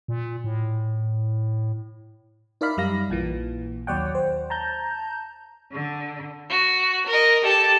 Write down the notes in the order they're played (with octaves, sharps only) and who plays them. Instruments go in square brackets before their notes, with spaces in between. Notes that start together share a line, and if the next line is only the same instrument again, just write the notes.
[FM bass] A#2
A2
[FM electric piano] D#4 A#4 D5 E5 F5 B5
F#2 G3 F5 A#6
A#1 A#2 E3
D#2 F#3 C#5 D5 F#5 G5
C5
A5 A#5 G6
[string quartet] D3
F#4
A#4 D#5
G4 A4 A5